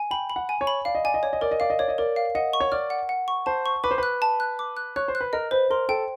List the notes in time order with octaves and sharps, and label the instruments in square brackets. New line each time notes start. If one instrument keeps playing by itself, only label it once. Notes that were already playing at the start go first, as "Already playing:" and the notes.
Already playing: [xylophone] G#5
[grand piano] G5 [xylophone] B5
[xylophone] B5
[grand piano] F#5
[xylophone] G#5
[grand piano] C#5
[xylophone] B5
[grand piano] D5 [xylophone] F5
[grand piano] D#5
[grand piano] D5 [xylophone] G#5
[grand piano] D#5
[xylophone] C#5 [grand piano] D5
[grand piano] D#5
[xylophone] A#4 [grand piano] D5
[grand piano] D#5
[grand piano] D5 [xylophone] F5
[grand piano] D#5
[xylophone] C#5 [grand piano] D5
[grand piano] D#5
[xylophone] A#4 [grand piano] D5
[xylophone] F5
[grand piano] D#5 [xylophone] F#5
[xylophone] C#6
[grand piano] C#5
[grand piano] D5 [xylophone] F6
[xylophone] F#5
F#5
C#6
[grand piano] C5 [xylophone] A5
[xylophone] C#6
[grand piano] B4 [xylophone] D6
[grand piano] C5
[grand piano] B4 [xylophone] F#6
[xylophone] A5
F#6
D6
F#6
[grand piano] C#5 [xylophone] F#6
[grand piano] C5
[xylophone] F#6
[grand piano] B4
[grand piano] A#4 [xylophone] D#5
[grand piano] B4 [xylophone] C5
[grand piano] A#4 [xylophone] C6
[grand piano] A4 [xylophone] G5